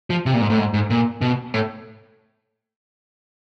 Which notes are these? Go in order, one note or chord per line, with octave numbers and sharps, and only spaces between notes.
F3
C3
A#2
G#2
A2
G#2
G#2
A#2
B2
A2